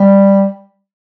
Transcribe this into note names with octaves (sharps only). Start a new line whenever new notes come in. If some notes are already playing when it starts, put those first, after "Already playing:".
Already playing: G3